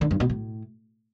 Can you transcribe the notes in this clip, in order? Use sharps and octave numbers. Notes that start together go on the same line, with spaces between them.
D3
G2
B2
A2